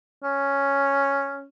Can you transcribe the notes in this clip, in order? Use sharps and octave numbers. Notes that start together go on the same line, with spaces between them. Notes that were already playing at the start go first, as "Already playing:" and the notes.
C#4